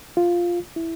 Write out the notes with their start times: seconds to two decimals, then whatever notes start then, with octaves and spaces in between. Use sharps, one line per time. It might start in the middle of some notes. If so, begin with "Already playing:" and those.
0.17 F4
0.76 E4